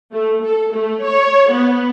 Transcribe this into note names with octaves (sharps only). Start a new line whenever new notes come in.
A3
A4
A3
C#5
B3